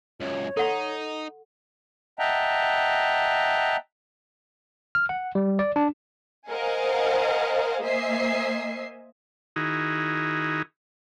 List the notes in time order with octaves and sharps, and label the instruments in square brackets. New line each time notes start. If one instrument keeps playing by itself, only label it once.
[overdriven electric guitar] C#2 F#2 [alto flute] C#5
[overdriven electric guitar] D#4 [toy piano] A4 F#5 C6
[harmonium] D#5 E5 F#5 G5 A5 A#5
[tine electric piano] F6
F#5
G3
D5
D4
[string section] A#4 C5 D#5 F5 F#5 G#5
A#3 C5 D#5 E5 G#5 C7
[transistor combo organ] D#3 D#4 E4 F#4 G#4